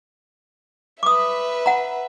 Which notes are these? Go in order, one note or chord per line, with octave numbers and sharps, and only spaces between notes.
B4 E5 D6 D#6
F#5 A#5